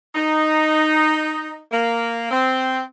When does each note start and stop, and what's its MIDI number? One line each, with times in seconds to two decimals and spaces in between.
0.15 1.61 63
1.72 2.27 58
2.31 2.82 60